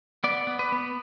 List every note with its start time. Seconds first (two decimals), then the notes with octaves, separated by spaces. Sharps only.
0.24 B3 D5
0.47 B3
0.59 B4
0.72 B3